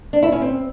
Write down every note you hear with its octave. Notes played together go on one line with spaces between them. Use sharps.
D4
E4
C#4
C4